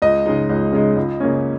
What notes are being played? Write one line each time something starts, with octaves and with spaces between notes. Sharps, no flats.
C#2 D#5
C#3 G#3 D#4
C#2
C#3 G#3 D#4
C#2
C#3 A#3 C#4